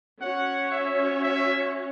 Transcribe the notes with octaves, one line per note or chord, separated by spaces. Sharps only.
C#4 F#4 C#5 F#5
E5
E5